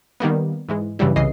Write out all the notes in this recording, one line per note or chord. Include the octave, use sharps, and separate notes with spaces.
D#3 G3 A#3 B3
G#2 E3 G#3
G2 C#3 E3 F#3 G3 E4
C2 C#3 E3 D#5 C7